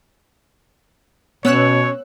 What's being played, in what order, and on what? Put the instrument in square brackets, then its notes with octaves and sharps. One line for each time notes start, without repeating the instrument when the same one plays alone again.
[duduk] B2 [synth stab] B3 E6 F#6 [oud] C#4 [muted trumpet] C#5